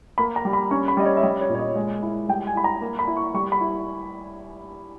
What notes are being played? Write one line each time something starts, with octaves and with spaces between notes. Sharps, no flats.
A#3 B5
A#5
G3
B5
C#4 C#6
B5
G3 D#5
C#5
E5
G3 D#5
C#5
A#2
C#5
D#5
G#3
E4
G3 G5
G#5
E4 B5
A#5
A#3
B5
E4
C#6
G3 C#6
B5
E4